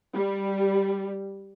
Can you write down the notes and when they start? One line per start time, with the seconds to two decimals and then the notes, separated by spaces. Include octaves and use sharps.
0.15 G3